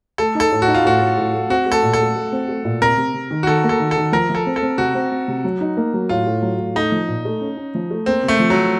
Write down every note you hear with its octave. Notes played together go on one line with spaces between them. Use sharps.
A3 A4
D#4 A4
A2
F#4
D#4
F4
A2 F#4
A2
A2
A3
C4 F#4
A3
A4
A#2
A4
A3
A3
C4
A3
A#2
C3 A#4
C3
C3
D#3
F#4
D#3 A4
A#3
A4
D#3
A4
D#3
F3 A#4
F3
A4
C4
A4
C4
C3 F#4
C4
C4
C3
F#3
D#4
A#3
F#3
A2 F4
A2
F#3
A2
A3 D#4
F3
A#2
A3
C#4
C#4
F3
A3
A#3 C4
C3
A3
F3
F#3
F3